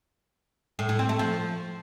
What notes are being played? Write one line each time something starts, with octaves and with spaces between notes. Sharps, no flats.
A2
A2
C4
A3
F3